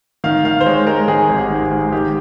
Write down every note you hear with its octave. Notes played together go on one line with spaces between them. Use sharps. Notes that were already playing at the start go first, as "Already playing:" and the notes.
D#3 F5
D#3 F5
C5
G#3 C#5
G#3 A#4
D#3 G#4
G#1
G4
D#3
G#2
D#3 G4